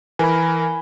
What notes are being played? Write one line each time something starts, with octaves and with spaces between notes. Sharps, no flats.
E3 A#4 G#5 B5